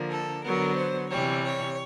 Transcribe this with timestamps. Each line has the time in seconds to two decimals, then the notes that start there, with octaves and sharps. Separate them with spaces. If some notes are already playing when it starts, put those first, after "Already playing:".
Already playing: D3 F3 A#3
0.10 A4
0.44 D3 F#3 B3 A#4
0.76 C5
1.10 C3 E3 G3 C#5
1.43 C#5